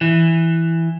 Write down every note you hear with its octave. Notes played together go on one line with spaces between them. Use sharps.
E3